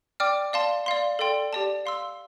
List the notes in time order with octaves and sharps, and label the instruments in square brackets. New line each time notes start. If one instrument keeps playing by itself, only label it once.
[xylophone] D5 G5 D6 F6
D5 F5 A5 C6
D5 F5 C6
A4 D5 G5 C6
G4 D5 A5
F5 C6 E6